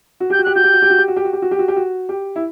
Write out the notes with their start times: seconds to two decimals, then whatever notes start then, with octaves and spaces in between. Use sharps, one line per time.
0.20 F#4
0.30 G4 G6
0.39 F#4
0.44 G4 F#6
0.55 F#4 G6
0.64 G4
0.73 F#4
0.82 G4
0.90 F#4
0.98 G4
1.08 F#4
1.16 G4
1.25 F#4
1.33 G4
1.42 F#4
1.51 G4
1.59 F#4
1.68 G4
1.76 F#4
2.09 G4
2.36 E4